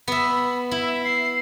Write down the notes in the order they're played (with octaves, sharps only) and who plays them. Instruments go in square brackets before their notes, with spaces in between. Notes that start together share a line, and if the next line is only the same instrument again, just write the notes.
[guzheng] B3 E5 [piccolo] B5
[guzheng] E4 [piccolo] E5
[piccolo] C7